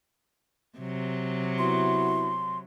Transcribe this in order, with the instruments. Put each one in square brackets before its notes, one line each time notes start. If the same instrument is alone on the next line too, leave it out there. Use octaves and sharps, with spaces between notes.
[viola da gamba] C3 F#3
[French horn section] B3 E4 F#4 [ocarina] C6